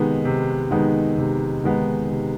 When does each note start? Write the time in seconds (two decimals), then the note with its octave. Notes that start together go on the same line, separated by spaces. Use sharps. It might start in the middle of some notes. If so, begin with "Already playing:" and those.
Already playing: C3 D#3 G#3 B3 D#4
0.25 C3
0.71 D#3 G#3 B3 D#4
1.18 C3
1.64 D#3 G#3 B3 D#4
2.11 C3